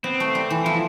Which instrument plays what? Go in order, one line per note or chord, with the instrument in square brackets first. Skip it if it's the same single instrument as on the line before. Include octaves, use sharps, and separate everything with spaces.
[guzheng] B3 [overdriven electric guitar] C4
[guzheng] A3
G3
E3
[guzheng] F3 [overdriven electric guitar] E4